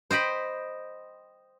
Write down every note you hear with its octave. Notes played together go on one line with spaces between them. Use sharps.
C5 D#5 G5 B5